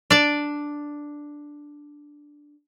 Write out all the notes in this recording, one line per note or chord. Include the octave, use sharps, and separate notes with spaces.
D4 D5